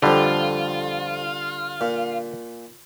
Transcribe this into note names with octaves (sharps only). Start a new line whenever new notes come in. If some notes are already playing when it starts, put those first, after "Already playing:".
F2 D3 F3 G3 F4
A#2